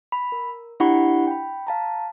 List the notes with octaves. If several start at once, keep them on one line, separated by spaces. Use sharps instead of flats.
B5
A#4
D4 E4 G4 F#5 B5 C#6
G5 B5
F5 A5 A#5